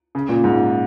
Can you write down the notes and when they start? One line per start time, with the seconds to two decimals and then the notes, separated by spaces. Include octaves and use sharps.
0.15 C#3
0.29 A#2
0.44 G#2